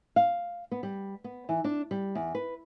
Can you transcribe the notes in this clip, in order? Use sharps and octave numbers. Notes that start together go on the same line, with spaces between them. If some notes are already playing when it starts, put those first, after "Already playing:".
F5
B3
G3
B3
E3
D4
G3
E2
B4